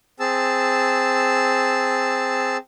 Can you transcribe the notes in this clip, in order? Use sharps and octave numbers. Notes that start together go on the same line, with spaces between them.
C4 G#4 A5 E6